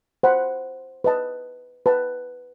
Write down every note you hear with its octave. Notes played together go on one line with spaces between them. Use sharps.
C5 F#5 B5
B4 D#5 A5
B4 D#5 A5